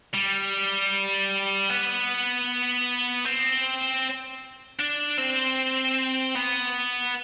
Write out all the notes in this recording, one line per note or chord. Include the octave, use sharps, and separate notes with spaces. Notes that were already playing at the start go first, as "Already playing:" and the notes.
G3
B3
C4
D4
C4
B3